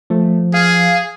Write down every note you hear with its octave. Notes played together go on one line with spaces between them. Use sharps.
F3 A3
G#4 F5